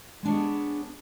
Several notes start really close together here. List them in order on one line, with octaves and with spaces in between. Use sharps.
G#3 D4 C#5 G#4 B3